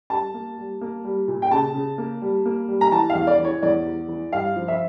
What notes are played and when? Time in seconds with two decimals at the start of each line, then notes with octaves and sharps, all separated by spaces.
0.10 G3 A5
0.34 A#3
0.58 G3
0.81 A#3
1.05 G3
1.28 A#2
1.42 G5
1.51 C#3 A5
1.74 C#3
1.98 A#3
2.22 G3
2.46 A#3
2.68 G3
2.81 A#5
2.91 E3 A5
3.10 F5
3.15 E2
3.27 D5
3.39 E3
3.44 C#5
3.62 E2 D5
3.86 E2
4.09 E3
4.33 G2 F5
4.56 F3
4.68 E5